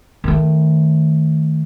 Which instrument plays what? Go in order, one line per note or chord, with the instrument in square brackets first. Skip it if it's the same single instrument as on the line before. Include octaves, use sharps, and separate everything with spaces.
[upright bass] D#3 A3